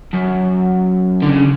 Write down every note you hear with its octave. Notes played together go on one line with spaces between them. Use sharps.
F#2
D3
C#3